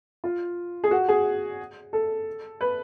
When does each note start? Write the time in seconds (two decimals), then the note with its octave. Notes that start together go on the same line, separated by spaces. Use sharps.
0.24 F4
0.84 G#4
0.91 F#4
1.08 G#4
1.93 A4
2.61 B4